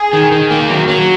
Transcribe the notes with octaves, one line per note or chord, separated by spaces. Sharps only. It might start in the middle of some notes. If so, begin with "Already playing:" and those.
Already playing: G#4
D#3
D#3
A#3
F#3
F#3